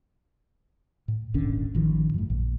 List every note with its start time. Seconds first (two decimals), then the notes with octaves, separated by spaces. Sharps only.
1.08 A2
1.34 D#1 G#1 D3 C#4
1.75 A1 D#3 F3
2.14 F#2 A2
2.30 A#1